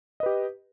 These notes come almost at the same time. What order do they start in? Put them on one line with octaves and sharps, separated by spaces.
D#5 B4 G4